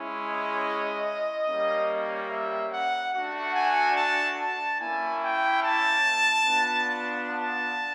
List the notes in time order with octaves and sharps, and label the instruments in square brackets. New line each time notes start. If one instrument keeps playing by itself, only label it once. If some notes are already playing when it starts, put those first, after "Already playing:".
Already playing: [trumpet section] G#3 C#4 E4
D#5
G3 A#3 C#4
E5
F#5
A3 D4 F#4 F#5
G#5
A5
A5
A#3 C#4 E4 G#5
G5
A5
B3 D4 F4
A5